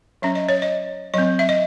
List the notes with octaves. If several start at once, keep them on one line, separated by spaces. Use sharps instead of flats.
F#3 C#4 E5
D#5
C#5
D#5
F#3 C4 D#5
E5
D#5